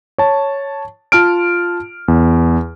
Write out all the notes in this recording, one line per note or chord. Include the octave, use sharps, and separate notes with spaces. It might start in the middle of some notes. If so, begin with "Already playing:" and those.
C#5 A5
F4 A5 F6 D7
E2